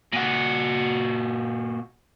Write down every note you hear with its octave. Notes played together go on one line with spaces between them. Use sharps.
A#2 F#4